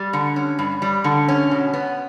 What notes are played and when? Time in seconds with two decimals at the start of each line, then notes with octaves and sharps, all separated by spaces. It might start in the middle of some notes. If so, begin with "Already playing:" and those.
Already playing: G3
0.13 D3
0.36 C#4
0.59 G2
0.82 G3
1.04 D3
1.28 C#4
1.51 B2
1.74 B3